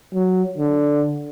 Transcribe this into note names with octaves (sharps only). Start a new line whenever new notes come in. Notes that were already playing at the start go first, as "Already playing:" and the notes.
F#3
D3